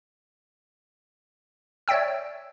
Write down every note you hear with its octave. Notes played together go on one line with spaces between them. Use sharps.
C#5 D5 E5 G5 E6